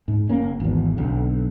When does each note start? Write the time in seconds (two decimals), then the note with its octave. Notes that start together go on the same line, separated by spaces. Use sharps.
0.08 G#2
0.29 F#1 A#3 C#4
0.60 G#1 E2
0.97 B1 D3 C4